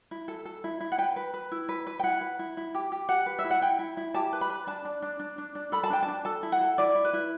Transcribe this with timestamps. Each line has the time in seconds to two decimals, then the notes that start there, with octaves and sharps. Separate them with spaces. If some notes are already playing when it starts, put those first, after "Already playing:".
0.11 E4
0.28 A4
0.45 A4
0.64 E4
0.81 E4
0.92 F#5
0.98 B4 G5
1.16 B4
1.34 B4
1.52 E4
1.69 B4
1.87 B4
1.99 G5
2.04 E4 F#5
2.21 B4
2.39 E4
2.57 E4
2.75 G4
2.92 G4
3.09 G4 F#5
3.26 B4
3.39 E5
3.45 E4
3.50 F#5
3.61 E4 G5
3.79 E4
3.97 E4
4.14 G4 A5
4.33 B4
4.41 B5
4.50 B4
4.67 D4 A5
4.85 D4
5.02 D4
5.20 D4
5.38 D4
5.55 D4
5.72 A4 B5
5.83 A5
5.90 D4 G5
6.03 A5
6.08 D4
6.25 A4 A5
6.43 E4
6.52 F#5
6.61 A4
6.78 E4 D5
6.95 E4
7.04 B4
7.13 E4